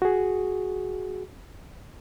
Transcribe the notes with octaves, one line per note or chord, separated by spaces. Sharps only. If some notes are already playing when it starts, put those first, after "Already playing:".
F#4 G#4